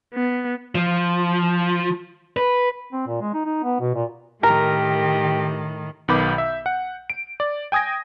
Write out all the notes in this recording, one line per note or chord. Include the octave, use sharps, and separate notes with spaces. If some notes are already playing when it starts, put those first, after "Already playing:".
B3
F3
B4
C4
A#2
G#3
D#4
D#4
B3
B2
A#2
A2 D#3 G4 A#4
B1 D#3 B3 B5 D6 G6
E5
F#5
D7
D5
G5 G#5 D#6 G#6 A#6